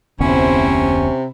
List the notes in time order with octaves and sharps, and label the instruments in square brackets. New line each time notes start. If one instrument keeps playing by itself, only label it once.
[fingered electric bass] F1 D2 B3 [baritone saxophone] C3 [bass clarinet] C#4 [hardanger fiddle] E4 C5